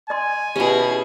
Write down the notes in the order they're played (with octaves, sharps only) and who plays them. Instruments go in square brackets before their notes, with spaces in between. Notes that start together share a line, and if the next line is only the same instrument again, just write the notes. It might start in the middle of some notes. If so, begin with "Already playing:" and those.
[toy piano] D#5 C6 [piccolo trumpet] G#5
[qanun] B2 C#4 [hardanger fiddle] E4 G#4 [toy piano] G4